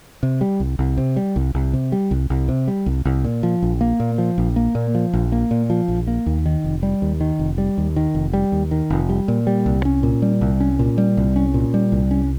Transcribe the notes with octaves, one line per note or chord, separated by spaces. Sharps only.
C3
G3
C2
C2
C3
G3
C2
C2
C3
G3
C2
C2
C3
G3
C2
C2
A#2
F3
A#1
A#3
A#2
F3
A#1
A#3
A#2
F3
A#1
A#3
A#2
F3
A#1
A#3
D#2
D#3
F1
G3
D#2
D#3
F1
G3
D#2
D#3
F1
G3
D#2
D#3
F1
G3
A#2
G3
C2
C#4
A#2
G3
C2
C#4
A#2
G3
C2
C#4
A#2
G3
C2
C#4